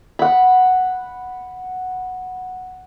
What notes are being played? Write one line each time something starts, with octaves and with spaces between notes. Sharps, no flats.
F#5 B5